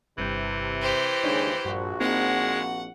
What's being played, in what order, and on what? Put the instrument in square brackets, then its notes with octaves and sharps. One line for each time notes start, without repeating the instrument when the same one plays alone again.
[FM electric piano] G1 G2 G6 [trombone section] C3 [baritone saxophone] E3
[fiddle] G4 C5
[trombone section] D#2 C#3 G#3 [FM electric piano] D4 D#4 C#5
[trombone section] A#1 F#4 [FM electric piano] G2
[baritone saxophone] G#3 [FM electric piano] A#3 C4 D#4 [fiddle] F#5